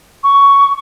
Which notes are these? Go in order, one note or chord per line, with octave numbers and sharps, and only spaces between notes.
C#6